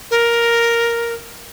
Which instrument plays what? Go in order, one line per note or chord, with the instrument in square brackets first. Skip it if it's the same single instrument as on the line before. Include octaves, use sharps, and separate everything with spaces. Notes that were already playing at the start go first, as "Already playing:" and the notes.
[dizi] A#4